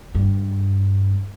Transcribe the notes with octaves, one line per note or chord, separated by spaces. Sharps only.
G2